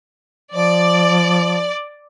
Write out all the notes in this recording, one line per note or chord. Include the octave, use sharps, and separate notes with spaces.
F3 D5